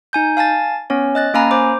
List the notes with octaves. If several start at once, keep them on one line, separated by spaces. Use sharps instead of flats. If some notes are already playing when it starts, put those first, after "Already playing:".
D#4 G#5 G6
F5 G#5 A5 A6
B3 C#4 C#5
D#5 F#6 A6
A#3 C#4 F5 G#5 A#5 B5
C5 D6